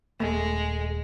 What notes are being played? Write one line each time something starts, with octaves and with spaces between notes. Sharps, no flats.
D#1 G#3 A3 B3